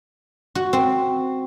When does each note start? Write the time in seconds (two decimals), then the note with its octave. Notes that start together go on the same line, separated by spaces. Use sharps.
0.55 F#4
0.73 C4